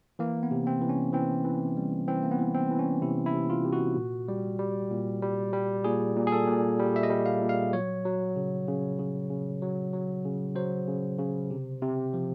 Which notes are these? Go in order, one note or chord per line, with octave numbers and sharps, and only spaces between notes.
E3 A#3
B3
C3
C4
E3
C#4
E3 C4
E3
G3
E3 C4
A#3
B3
E3
C4
E3
C#4
C3 E4
E4
C3
F4
C3
F#4
A#2
G3
G3
A#2
G3
G3
A#2 G#4
A#2
G#4
A4
A#2
G3
E5
D#5
G3
F5
A#2
F5
F#3 C#5
F#3
C#3
C#3
C#3
C#3
F#3
F#3
C#3
F#3 C5
C#3
C#3
C3
C3
F3